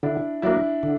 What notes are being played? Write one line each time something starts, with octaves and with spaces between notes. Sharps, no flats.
D3 D4 E4
F#3 A#3 D4 E4
D3